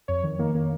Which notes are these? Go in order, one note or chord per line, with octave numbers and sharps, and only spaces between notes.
F2 C#5
D#3
D#3 A#3
D#3 A#3